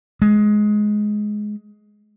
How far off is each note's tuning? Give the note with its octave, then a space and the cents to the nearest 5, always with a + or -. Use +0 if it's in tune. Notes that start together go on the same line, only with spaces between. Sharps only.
G#3 +15